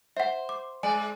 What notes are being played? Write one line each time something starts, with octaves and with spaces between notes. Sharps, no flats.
C5 E5 F#5
D6
G#3 D5 G#5